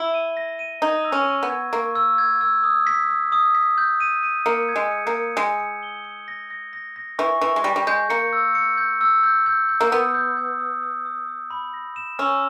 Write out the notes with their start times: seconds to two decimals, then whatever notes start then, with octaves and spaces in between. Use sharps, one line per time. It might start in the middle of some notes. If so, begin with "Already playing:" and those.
Already playing: E4 G7
0.14 D#7
0.37 A#6
0.59 D#7
0.82 D#4 G#6
1.05 E6
1.12 C#4
1.27 C#6
1.43 B3
1.50 G#6
1.73 A#3 C#6
1.95 E6
2.18 G#6
2.41 E6
2.64 D#6
2.87 B6
3.09 D#6
3.32 D#6
3.55 B6
3.78 G6
4.00 D#7
4.23 D#7
4.46 A#3 C#7
4.69 G#6
4.76 G#3
4.91 C#7
5.07 A#3
5.14 C#7
5.37 G#3 C#7
5.60 C#7
5.83 G7
6.05 C#7
6.28 A#6
6.50 A#6
6.73 A#6
6.96 A#6
7.19 E3 C#6
7.41 E3 C#6
7.56 G#3
7.64 G3 A#6
7.76 G3
7.87 G#3 G6
8.10 A#3 C#7
8.33 E6
8.55 C#7
8.78 G6
9.01 E6
9.23 G6
9.46 G6
9.69 G6
9.81 A#3
9.92 B3 D#6
10.14 G6
10.37 G6
10.59 D#6
10.83 D#6
11.05 D#6
11.28 D#6
11.50 B5
11.74 A#6
11.96 E7
12.19 C#4 E6